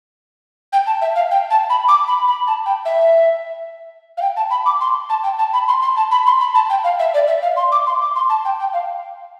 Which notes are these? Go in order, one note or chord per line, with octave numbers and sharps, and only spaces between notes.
G5
A5
E5
F5
G5
A5
B5
D6
B5
B5
A5
G5
E5
F5
G5
A5
B5
D6
C6
A5
G5
A5
B5
C6
C6
A5
B5
C6
B5
A5
G5
F5
E5
D5
E5
F5
C6
D6
C6
D6
C6
A5
G5
G5
F5